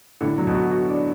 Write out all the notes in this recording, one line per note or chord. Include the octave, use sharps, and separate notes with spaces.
A2 D3
F#3
B2
F#4
F#4
D4